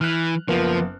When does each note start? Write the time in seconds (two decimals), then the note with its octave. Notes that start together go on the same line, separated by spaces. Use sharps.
0.01 E3 F6 F#6
0.48 F#1 F3 A#3 B3